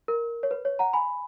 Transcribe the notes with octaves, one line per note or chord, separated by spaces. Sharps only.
A#4
C#5
B4
C#5
F#5 A#5
G#5 B5